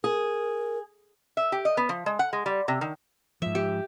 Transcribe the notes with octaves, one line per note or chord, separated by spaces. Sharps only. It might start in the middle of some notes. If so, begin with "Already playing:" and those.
G#4 A#4
E5
G4
D#5
B3
F3
G#3
F#5
G#3
G3
C3
D#3
G#2 F3 E5
G4